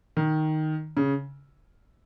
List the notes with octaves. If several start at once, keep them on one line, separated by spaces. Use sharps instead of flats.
D#3
C#3